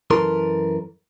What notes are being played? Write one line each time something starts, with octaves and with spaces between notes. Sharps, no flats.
F#2 E3 A4 A#4 C6